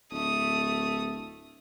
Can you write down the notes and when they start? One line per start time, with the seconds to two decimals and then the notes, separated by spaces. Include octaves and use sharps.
0.12 D1 A3 D#6